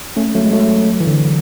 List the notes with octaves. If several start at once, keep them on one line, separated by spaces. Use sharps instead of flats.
A3 C#4
F#3 A3
G#3
F#3 A3
E3
D3 F#3